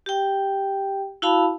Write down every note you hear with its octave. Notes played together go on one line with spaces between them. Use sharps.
G4 G5
E4 F#4 F5 A5 B5